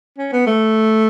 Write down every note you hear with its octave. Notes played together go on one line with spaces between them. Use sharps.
C#4
B3
A3